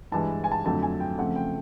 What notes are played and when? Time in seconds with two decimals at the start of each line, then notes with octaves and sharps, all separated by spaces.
0.12 G2 E3 G#3 A5
0.44 G#5
0.52 A5
0.65 F2 D3 F#3 A3 A5
0.83 G#5
1.00 G5
1.18 C#3 F3 A3 C4 F#5
1.36 G5